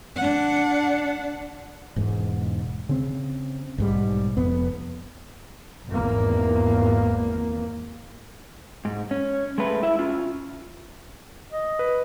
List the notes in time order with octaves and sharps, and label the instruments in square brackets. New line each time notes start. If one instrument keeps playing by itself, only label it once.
[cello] D4 F#5
[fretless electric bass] E1 G#2
C#3 C4
B1 G#2 G3
F1 F2 B3
[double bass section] G#1 E2 A#3
[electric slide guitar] G#2
C#4
G#3 A3 B4
E4 E5
C#4 F4
[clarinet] D#5
[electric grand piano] B4